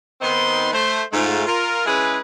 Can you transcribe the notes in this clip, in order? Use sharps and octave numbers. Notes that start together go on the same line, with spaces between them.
D#3 B3 C4 D#4 B4 C6
A3 C5
G#2 A3 F4
F4 A#4
G#3 C#4 E4 G#4 B4